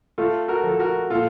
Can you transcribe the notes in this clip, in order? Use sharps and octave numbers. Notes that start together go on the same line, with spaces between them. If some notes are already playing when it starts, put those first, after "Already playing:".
A3 F4 A4
F#4 A#4
F3 A4
F#4 A#4
A#2 F4 A4